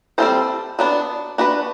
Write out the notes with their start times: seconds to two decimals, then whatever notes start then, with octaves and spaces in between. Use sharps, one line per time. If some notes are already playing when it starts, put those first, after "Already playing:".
0.18 G3 C4 F4 A4 C5
0.79 F#3 B3 D4
1.38 D4 F#4 B4